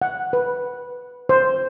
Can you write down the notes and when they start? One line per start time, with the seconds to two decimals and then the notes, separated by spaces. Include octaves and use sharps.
0.02 F#5
0.33 B4
1.29 C5